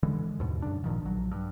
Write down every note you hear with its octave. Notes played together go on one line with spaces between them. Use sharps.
D3 E3 G#3
D#2 G#2 B2
F#2 C#3 D4
G#1 A#2 D#3 F3
A#1 F#3
G2